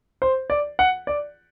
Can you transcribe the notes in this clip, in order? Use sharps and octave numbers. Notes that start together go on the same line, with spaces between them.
C5
D5
F#5
D5